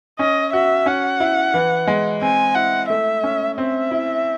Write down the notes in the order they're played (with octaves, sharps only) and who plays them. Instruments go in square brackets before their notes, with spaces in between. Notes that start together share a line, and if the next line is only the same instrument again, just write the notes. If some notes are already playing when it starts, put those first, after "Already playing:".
[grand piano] C#4 [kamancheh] D#5
[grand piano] F#4 [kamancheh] E5
[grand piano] C#4 [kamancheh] F#5
[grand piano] E4
E3
G#3
[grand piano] C4 [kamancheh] G#5
[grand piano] E4 [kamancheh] F#5
[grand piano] A3 [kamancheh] E5
[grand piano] C#4
[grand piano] C4 [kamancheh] E5
[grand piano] E4